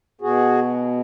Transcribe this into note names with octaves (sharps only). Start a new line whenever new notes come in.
B2 F#4 G#4